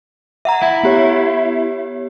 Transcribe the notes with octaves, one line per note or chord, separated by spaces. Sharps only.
E5 F#5 A#5
E4
B3 G4 C#5